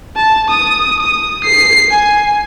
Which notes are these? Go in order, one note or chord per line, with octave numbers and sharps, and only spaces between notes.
A5
D#6
D#6
C7
G#5